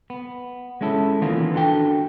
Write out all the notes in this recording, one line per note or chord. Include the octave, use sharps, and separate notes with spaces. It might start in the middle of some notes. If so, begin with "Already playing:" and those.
B3
G#3 C#4 E4 A4
D#3 E3 A#3 B3 C#4 F4
D4 F#4 A4 G5